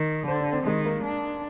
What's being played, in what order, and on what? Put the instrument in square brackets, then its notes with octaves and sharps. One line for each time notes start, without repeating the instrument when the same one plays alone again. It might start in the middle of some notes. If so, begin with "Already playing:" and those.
Already playing: [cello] D#3
[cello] D3 [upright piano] C5
[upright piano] D4
C4
[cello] D#3 [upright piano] G#3
[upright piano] A#3
[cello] D4